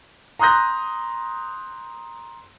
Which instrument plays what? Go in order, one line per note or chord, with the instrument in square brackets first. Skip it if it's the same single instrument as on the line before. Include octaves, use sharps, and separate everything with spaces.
[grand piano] A#5 C6 D#6 F#6 G6 A#6